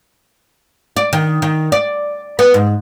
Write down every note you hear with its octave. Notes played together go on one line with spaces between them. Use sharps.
D5
D#3
D#3
D5
B3
G#2